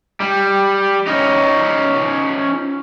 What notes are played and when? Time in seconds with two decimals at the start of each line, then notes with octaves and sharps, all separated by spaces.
0.20 G3
1.07 C#4 D#4